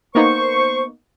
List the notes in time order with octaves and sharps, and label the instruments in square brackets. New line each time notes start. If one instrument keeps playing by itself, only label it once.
[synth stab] A#3 B3 D#4 [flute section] C5 [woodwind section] C#6